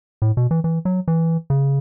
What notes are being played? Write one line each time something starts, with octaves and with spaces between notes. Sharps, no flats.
A2
B2
E3
E3
F#3
E3
C#3